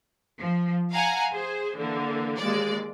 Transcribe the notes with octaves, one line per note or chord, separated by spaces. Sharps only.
F3
F5 F#5 G#5 A#5
G#4 C5
D3 E3 A#3
D#2 G#3 D5